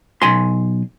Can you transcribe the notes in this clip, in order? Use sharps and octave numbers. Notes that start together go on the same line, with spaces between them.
B1 G#5 C6